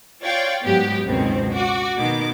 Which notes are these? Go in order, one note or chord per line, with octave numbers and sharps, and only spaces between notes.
F4 C#5 D5 F5 G5
G#2 F#3 B3 G4
C#2 F#2 B2 D#3 C4
F#4 D6
B2 D#3 B3 D6